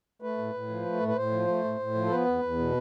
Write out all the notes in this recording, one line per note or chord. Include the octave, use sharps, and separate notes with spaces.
A3 B4
A2
A2
F3
A3
A2
B4
A2 C5
F3
A3
A2
A2
F3
A4
B3 B4
E2
E2
B2